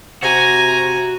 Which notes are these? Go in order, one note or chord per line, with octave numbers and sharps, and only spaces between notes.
C3 F#4 G#5 A#5